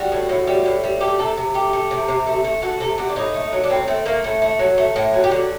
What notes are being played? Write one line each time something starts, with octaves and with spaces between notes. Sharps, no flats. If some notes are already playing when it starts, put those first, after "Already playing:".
Already playing: G3 F#4
A2
A2
G3
A2
G3
A3 G4
C3 A4
C3
A3 G4
A3
C3
C3
A3
A3
A3 F#4
C3 A4
C3 F#4
D4
A2 D#4
A3
F#3
D4
A2 C4
A3 C4
A3 A#3
A2 A3
A3
F#3
A3
A2
F#3
G4
D3 F#4